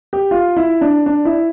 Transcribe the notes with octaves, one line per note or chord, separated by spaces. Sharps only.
G4
F4
E4
D4
D4
E4